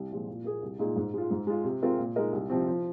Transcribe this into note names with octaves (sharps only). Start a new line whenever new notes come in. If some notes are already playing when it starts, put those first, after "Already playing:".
Already playing: C2
A#2 F3 G#3
A#2
A#3 G#4
C2
A#2 G#3 D#4 G#4
G#2
G#3 F4
G#2
G#3 F4
C3
G#3 C4 F4 A#4
A#2
G#3 D#4 A#4 D#5
C2
C3 F3 C4
F3